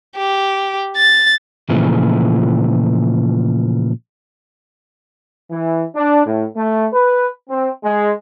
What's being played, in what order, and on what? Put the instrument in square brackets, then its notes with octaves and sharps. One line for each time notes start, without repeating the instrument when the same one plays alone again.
[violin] G4
A6
[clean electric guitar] A#2 C#3 E3 F3 A3
[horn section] E3
D4
A2
A3
B4
C4
G#3